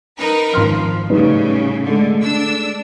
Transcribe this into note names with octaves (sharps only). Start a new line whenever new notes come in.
D#4 A#4 B4
G#1 F3 C6 F6
A2 C#3 G3 D#4 B4
D3 G#3 A3
D4 E6